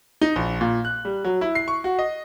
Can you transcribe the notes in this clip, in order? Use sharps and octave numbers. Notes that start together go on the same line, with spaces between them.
D#4
A#1
A#2
F#6
G3
F#3
E4
C7
C#6
F#4
D#5